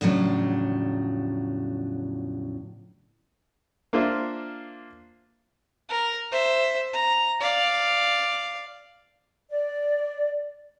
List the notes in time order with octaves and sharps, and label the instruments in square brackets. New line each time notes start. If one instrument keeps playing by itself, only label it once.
[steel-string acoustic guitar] E2 A2 C#3 F3 F#3 D4
[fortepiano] A#3 D4 F4 C5 E5
[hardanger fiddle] A#4
C5 E5
A#5
D5 F5
[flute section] D5